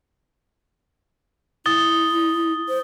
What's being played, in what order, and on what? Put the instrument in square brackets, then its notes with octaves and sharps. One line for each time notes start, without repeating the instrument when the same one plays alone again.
[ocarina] E4 [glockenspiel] D#6 A6 G7
[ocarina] C5